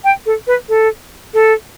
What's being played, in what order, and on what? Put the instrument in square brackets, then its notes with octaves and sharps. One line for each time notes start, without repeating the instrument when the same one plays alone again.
[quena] G5
A4
B4
A4
A4